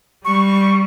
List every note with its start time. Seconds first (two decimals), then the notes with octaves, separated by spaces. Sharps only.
0.25 G3 C#6